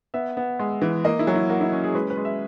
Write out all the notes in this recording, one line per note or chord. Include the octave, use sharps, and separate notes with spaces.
B3 E5
B3
G#3
E3
A#3 D#5
E4
F#3
E4
A#3 F#4
E4
C#4
G#4
G#3 B4
B4
G#3
E5